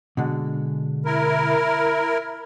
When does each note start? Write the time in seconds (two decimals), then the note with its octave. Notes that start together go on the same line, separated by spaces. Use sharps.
0.17 B2 D3 G#3
1.05 E4 A#4